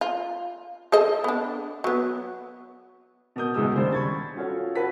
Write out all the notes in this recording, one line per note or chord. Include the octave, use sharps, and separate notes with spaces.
F4
G#4 A4 D#5
B3 D4
F#3 B3
B2 A#4 D#6 G6
C#2 F#2 B2 G#3 D#6 E6
D#2 C#3 G3 C5
B5 C#6 G#6 A6
C#4 F4 F#4 A4 C#5
F#4 B4 A5 B6